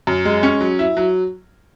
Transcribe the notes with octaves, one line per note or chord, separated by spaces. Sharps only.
F#2
G#3
C#4
F#3
E4
F#3